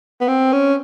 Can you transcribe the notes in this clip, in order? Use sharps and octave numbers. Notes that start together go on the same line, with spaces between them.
B3
C4
C#4